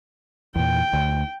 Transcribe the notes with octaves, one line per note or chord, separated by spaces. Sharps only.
E2 A#2 G5
D2